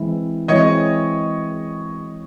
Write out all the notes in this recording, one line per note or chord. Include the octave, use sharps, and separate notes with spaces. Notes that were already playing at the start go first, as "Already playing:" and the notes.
Already playing: E3 G#3 C4 E4
E3 G#3 C4 E4 C#5 D#5